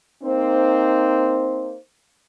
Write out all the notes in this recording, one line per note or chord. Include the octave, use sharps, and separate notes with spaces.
A#3 C4 D#4 C5